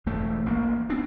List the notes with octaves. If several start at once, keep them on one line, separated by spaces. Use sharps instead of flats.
E1 E2 G#2 A3
A1 A#3
B3 C4 D4